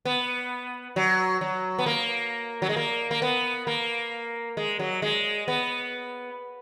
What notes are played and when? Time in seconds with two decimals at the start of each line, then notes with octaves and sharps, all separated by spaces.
0.05 B3
0.96 F#3
1.41 F#3
1.79 B3
1.86 A#3
2.62 F#3
2.69 G#3
2.77 A#3
3.11 A#3
3.22 B3
3.67 A#3
4.57 G#3
4.79 F#3
5.02 G#3
5.48 B3